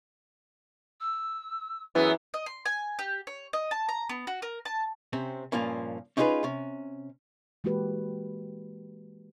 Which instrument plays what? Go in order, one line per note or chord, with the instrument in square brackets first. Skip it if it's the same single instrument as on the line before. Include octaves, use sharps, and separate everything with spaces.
[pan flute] E6
[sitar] F#2 B3 [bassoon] E3 [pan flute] G#4
[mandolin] D#5
C6
G#5
G4
C#5
D#5
A5
A#5
B3
F#4
A#4
A5
[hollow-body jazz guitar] C3 C4 C#4
G2 A#2 F3 A#3 C#4
C#4 D#4 F4 G4 G#4 B4
C3 C#4
[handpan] E3 G#3 A#3 F#4 G4 B4